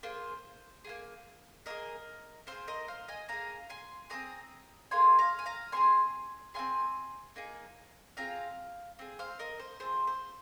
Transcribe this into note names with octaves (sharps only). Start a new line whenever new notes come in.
A#3 F4 G#4 C5
A#3 F4 G#4
A#3 F4 G#4 A#4 D#5
C4 G#4 C5 F5
A#4 D#5
C5 F5
D#5 G#5
A#3 G#4 F5 A#5
G#5 C6
C4 F4 G#4 A#5 D#6
A#3 F4 G#4 G#5 C6
F5 A#5
G#5
F5 A#5
C4 F4 G#4 G#5 C6
C4 F4 G#4 G#5 C6
A#3 D#4 G#4
C4 F4 G#4 F5 A#5
C4 G#4
C5 F5
A#4 D#5
C5
C4 F4 G#4 C5
C5